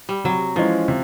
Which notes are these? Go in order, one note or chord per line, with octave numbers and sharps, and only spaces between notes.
G3
C3 F#3
E3 F3 G#3 C#4
C3